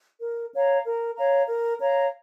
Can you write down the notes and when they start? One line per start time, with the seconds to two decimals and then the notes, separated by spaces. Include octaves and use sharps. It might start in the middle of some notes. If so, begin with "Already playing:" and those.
0.21 A#4
0.53 C#5 F5 A#5
0.85 A#4
1.16 C#5 F5 A#5
1.48 A#4
1.80 C#5 F5 A#5